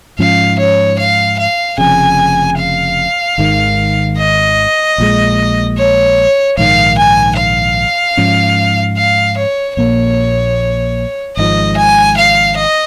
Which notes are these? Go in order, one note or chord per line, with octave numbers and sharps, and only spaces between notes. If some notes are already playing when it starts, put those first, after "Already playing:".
G#2 F3 C#4 F5
C#5
F5
F5
F1 F2 C#3 G#5
F5
G#1 G#2 D#3
D#5
A#1 A#2 G#3
C#5
A#1 G#2 D#3 F5
G#5
F5
G#2 F3 C#4
F5
C#5
A#1 A#2 A#3 C#5
G#1 G#2 F3 D#5
G#5
F5
D#5